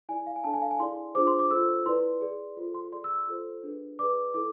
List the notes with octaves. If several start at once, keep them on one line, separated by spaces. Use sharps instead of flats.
E4 G#4 D5 G#5
F5
G#5
D4 A4 D5 A5
G#5
F5
G#5
E4 G#4 D5 C6
D4 F4 G#4 C5 D6
C6
D6
F4 A4 C5 E6
E4 B4 D5 C6
G#4 D5
F4 A4 C5
C6
G#4 D5 C6
E6
F4 A4 C5
D4 G#4 B4
G#4 B4 D5 D6
E4 A4 D6